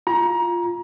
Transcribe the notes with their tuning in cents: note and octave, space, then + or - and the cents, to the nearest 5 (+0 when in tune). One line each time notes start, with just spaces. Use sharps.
F4 +0 A#5 +25